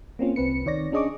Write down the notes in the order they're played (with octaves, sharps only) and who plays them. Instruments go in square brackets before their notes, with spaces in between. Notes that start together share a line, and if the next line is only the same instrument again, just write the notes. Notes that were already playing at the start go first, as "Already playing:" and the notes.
[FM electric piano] A#3 C4 C#4 F4
C2 C4 B4 C#7
D#3 C#5 D5 A#6
C#4 D4 G#4 D#5 C#6 D6